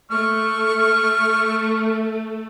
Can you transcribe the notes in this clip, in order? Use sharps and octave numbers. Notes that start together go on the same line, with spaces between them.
A3 C#6 F6